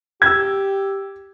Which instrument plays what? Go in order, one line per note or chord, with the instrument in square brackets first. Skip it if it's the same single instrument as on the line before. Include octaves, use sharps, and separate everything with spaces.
[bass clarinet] G4 [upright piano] E6 G#6